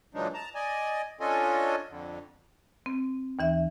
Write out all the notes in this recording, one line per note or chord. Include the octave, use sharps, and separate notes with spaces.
A#2 E3 F#3 G#3 D4 D#4
A5 A#5
D5 D#5 G#5
C#4 D4 F4 A4 D#5 G#5
F2 D3
C4
D#2 E3 E5